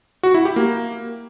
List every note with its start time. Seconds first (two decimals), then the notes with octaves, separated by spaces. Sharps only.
0.23 F#4
0.34 E4
0.45 G4
0.56 A#3